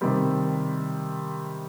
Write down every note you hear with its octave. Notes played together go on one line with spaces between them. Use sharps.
C3 D#3 G3 C4